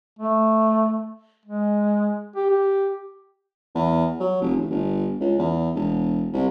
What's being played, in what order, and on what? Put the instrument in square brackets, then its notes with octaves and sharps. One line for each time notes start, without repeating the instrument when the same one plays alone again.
[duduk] A3
G#3
G4
G4
[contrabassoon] E2
F#3
F1
A1
G1
C#2
E2
E1
C2